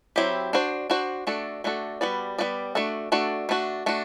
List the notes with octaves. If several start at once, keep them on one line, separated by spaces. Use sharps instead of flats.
F#3 C4 E4 G4
D4 F#4 C5
D4 F#4 C5
A3 D4 F#4 A4
A3 D4 F#4 A4
G3 B3 F#4 B4 D5
G3 B3 F#4 B4 D5
A3 D4 F#4 A4
A3 D4 F#4 A4
A3 D4 F#4
A3 D4 F#4